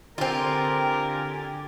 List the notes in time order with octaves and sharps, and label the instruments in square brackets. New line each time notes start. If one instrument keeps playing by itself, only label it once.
[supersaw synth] D3 G#5 A6 [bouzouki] C4 F4 [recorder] G4 [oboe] A#4